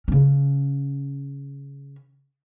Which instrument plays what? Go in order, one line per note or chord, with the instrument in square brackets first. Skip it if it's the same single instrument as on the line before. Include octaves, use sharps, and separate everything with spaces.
[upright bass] C#3 C#4